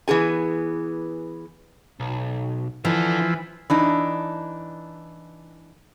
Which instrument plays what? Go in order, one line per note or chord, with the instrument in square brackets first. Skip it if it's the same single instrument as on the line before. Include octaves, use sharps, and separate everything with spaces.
[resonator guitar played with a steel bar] E3 B3 G#4 G#5
[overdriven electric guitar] B1
[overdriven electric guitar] D3 D4 [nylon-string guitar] E3 [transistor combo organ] F3 E4
[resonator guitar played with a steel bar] E3 D4 D#4